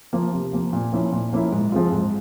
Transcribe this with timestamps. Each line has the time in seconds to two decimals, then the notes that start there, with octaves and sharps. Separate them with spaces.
0.13 F3 A#3
0.33 C3
0.53 F3 A#3
0.73 A#2
0.93 F3 A#3 C#4 E4
1.12 A#2
1.33 F3 A#3 C#4 E4
1.52 G#2
1.72 F3 G#3 C4 F4
1.92 G#2